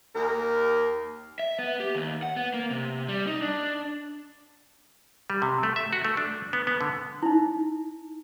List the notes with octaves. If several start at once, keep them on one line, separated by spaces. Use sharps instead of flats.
D#2 A#4
E5
B3
G4
D#2
F#5
B3
A#3
C3
G3
D#4
D4
G3
C3
A3
E5
F#4
A3
D4
B3
B3
D3
D#4 E4